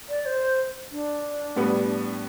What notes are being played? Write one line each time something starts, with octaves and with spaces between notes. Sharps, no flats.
D5
C5
D4
A2 G3 B3